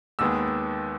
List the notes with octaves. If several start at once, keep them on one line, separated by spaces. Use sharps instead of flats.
D#2 D#3 G#3 B3 E6